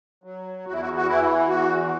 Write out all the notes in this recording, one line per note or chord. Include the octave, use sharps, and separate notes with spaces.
F#3
E2 F#4
E4
F#4
F#4
E3 E4
E2 F#4